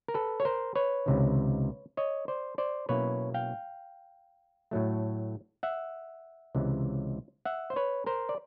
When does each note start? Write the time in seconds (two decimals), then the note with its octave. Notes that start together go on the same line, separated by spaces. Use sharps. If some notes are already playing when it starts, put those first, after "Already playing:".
0.08 A#4
0.14 A4 B4
0.40 C#5
0.45 A#4 C5
0.75 B4 C#5
1.06 C#2 C3 D#3
1.97 C#5 D#5
2.28 C5 D5
2.58 C5 D5
2.89 B2 F#3 A#3 C#4 E4 B4 C#5
3.34 F5 G5
4.71 A2 F#3 A3
5.63 E5 F#5
6.55 C#2 C3 E3 G#3
7.45 E5 F#5
7.70 C5
7.76 B4 C#5
8.06 A#4 C5
8.29 D5